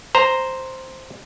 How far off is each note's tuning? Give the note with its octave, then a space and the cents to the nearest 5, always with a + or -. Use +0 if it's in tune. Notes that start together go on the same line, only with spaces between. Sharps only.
C5 +0 A#5 +0